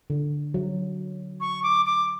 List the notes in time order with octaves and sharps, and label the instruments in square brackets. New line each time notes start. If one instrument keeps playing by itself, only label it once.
[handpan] D3
F#3
[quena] C#6
D6
D6